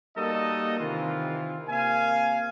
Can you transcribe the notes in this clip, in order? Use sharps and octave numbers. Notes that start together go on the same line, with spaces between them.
G3 A#3 D#4 F#4 A4 D#5
C3 D#3 E3 F4
C3 A#3 F5 G#5